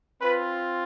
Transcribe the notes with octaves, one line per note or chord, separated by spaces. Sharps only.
C4 F4 B4